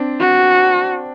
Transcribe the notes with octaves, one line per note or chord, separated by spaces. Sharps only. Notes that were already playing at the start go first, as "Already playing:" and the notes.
Already playing: C4 D4
F#4